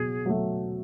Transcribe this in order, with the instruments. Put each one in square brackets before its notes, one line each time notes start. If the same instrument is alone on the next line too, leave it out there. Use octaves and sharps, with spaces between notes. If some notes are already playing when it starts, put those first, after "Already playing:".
Already playing: [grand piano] B2 F#3 [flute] G#4
[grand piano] F#3 A3